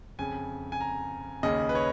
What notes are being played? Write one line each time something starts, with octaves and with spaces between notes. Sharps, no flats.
F2 C#3 G#5
G#5
A#5
D#2 C#3 D#5
B4
C#5